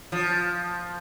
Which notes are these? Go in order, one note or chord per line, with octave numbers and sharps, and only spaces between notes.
F3